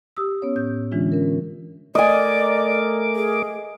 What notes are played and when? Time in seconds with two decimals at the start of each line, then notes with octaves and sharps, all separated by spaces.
0.17 G4 D#6 E6
0.42 B3 C#4 C#5
0.56 A2 G6
0.92 D3 E3 G#3 C#4 D4 F4
1.12 C#4 A#4
1.95 A3 A#4 D5 D#5 G#5 D6
3.15 G#4